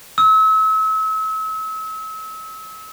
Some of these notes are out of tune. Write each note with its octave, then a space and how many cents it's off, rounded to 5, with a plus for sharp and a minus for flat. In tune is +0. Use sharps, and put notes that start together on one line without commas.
E6 -35